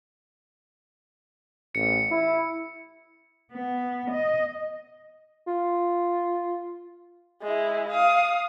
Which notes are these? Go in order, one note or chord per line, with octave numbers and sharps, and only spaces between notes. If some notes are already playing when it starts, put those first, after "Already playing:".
A1 C#7
E4
B3
D#5
F4
G#3 E4
F5 D#6